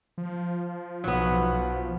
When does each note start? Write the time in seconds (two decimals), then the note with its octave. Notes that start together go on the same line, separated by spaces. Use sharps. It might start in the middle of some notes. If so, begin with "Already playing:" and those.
0.18 F3
1.04 B1 F#3 B3